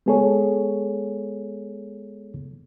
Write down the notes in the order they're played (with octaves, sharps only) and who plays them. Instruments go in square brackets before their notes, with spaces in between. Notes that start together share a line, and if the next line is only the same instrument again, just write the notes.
[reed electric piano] G#3 B3 G#4 A4 C#5